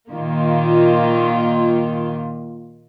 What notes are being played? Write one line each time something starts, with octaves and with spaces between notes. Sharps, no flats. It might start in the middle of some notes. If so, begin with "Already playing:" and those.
A#2 D#3 A#3 F4